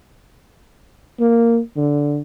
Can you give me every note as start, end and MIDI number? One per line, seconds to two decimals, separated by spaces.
1.20 1.59 58
1.77 2.20 50